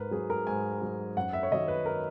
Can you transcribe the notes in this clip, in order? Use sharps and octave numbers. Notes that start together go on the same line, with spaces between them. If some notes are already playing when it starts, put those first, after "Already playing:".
Already playing: G#2 A#4 B4
F#3 G#4
A#4
G#2 G#5
F#3
F#2 F#5
E5
C#5
D#3 F#3 D#5
B4
A#4